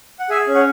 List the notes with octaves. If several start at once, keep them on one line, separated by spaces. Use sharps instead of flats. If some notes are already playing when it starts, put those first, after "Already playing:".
F#5
G#4 E5 G#5
C#4
C#5 F#5